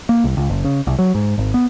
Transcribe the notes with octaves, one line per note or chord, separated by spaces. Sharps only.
A#3
C2
C#2
F#1
C#3
C2
F#3
G#2
G#1
B3